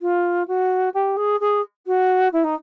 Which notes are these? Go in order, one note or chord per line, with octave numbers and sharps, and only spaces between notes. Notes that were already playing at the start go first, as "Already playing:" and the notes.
F4
F#4
G4
G#4
G#4
F#4
E4
D#4